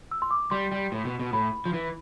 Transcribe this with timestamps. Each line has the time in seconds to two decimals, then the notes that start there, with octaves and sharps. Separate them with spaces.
0.11 E6
0.22 C6
0.31 D6
0.51 G3 C6
0.72 G3
0.92 A2
1.05 B2
1.19 B2
1.33 A2 B5
1.66 F3
1.73 E3